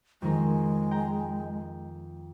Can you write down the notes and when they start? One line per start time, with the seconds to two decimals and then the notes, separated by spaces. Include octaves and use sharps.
0.22 F2 D#3 G#3 A#4
0.91 G5 A#5